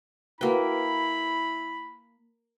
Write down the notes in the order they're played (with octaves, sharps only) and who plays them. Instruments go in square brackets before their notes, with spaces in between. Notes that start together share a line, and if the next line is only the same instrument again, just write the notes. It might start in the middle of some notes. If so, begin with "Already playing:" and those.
[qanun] A#3 G5 [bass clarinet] E4 [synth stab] F#4 B4 [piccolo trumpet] B5